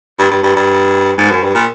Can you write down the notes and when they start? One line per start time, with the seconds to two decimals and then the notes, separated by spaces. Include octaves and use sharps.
0.19 G2
0.31 G2
0.43 G2
0.56 G2
1.18 G#2
1.30 F#2
1.43 G2
1.55 A#2